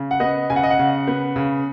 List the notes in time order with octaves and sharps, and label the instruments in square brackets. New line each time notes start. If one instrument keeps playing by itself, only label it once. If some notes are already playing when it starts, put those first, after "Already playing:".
Already playing: [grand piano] C#3
F#5
B3 D#5
C#3 G#5
F#5
D#5
F#5
C#3
B3
C#3